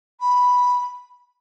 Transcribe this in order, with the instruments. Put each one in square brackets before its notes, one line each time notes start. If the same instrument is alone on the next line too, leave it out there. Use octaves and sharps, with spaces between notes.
[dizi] B5